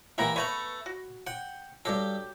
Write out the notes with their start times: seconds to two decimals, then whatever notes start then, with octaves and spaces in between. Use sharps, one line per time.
0.18 E3 A#3 E4 G4 F#5 A#5
0.36 A3 B3 B4 C#5 A#5 B5
0.86 F#4
1.27 F#5 G5
1.85 G2 F#3 G4 A4